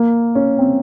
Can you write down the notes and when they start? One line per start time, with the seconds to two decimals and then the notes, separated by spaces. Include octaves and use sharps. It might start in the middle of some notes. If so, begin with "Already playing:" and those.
Already playing: A#3
0.35 C#4
0.59 C4